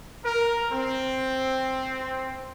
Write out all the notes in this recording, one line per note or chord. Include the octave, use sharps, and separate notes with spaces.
A#4
C4